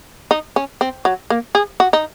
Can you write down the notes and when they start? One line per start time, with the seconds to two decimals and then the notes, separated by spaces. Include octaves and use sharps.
0.31 D#4
0.56 C#4
0.81 C4
1.05 F#3
1.30 A#3
1.55 G#4
1.80 F#4
1.93 D#4